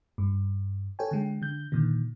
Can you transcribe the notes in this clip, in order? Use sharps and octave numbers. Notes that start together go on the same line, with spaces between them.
G2
A4 C#5 G5 G#5
D3 G#3 G5
D3 G6
A#2 D3 D#3